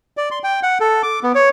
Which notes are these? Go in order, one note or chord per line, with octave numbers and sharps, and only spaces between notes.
D5
C6
G5
F#5
A4
D6
B3
C#5